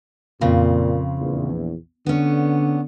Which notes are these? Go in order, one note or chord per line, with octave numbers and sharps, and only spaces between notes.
F2 A#2 C#3 C4
A#1 E2
D3 B3 C#4